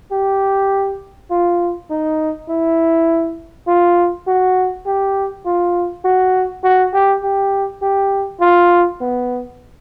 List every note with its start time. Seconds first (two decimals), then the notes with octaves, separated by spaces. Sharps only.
0.12 G4
1.31 F4
1.90 D#4
2.49 E4
3.67 F4
4.27 F#4
4.86 G4
5.46 F4
6.05 F#4
6.64 F#4
6.94 G4
7.23 G4
7.82 G4
8.41 F4
9.01 B3